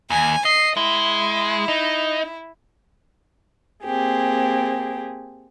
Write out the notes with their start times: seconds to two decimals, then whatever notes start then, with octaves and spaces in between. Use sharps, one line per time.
0.10 D#2 G#5
0.45 D#5 C7
0.77 G#3 E4
1.68 D#4
3.85 A#3 C4 G4 G#4